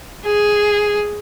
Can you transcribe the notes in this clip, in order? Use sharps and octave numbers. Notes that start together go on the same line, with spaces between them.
G#4